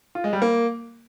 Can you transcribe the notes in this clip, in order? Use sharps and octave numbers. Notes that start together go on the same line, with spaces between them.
F4
G#3
G3
A#3